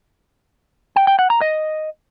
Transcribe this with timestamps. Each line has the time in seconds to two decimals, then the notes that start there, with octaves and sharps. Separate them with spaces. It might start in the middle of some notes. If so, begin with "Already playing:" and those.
0.96 G5
1.07 G5
1.19 F#5
1.30 A#5
1.41 D#5